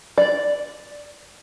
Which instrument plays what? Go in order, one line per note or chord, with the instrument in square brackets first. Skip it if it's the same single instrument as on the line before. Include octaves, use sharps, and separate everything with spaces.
[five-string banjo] D5